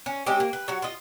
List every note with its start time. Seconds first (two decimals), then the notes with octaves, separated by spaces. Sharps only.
0.06 C#4
0.26 G#3 C4 C#4 G4
0.40 A#3
0.53 B4
0.68 F#3 F#4
0.82 F4 D#5